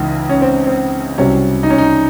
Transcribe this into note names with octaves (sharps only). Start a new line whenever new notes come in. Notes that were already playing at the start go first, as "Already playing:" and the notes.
Already playing: C#2 C#3 E3 G#3 D#4
C#4
C4
C4
C2 C3 F#3 C#4
D#4
C#4
D#4